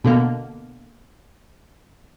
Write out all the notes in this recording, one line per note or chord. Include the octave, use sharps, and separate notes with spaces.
B2 D3 A#3